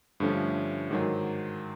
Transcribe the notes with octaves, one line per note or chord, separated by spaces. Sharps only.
G2 D3 F3 A3 C#4
G#2 D#3 F#3